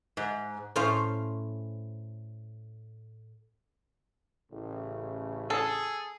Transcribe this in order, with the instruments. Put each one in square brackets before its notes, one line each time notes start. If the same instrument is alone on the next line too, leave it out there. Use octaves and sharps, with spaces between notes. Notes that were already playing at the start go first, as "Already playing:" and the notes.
[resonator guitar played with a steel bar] G#2
[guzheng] A2 A3 C#4 C5 F5
[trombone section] A1 A2 C#3
[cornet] G#4 [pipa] A4